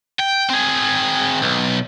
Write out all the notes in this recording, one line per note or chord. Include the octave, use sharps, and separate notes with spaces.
G5
C4 G#4
B1